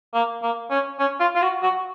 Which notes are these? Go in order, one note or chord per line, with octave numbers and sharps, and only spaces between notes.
A#3
A#3
C#4
C#4
F4
F4
F#4
F#4